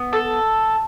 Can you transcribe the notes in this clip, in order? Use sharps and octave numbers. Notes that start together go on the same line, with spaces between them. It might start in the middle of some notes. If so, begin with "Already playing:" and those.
Already playing: B3
A4